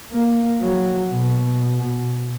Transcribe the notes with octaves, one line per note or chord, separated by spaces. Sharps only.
A#3
F#3
B2